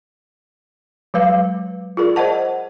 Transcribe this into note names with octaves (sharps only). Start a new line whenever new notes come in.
F#3 G#3 B4 F5
F4 G#4 A#4 D5
C5 D#5 F#5 A5